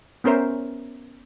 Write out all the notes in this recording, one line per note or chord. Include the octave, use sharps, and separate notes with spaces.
B3 C#4 A#4 C5 E5